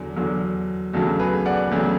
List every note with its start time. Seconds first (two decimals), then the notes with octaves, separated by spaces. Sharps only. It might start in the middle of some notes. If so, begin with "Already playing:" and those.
Already playing: E2 D3 F#3
0.16 E2 D3 F#3
0.93 D2 C#3 F#3 F#4 A4
1.19 G#4 B4
1.46 D5 F#5
1.71 D2 C#3 F#3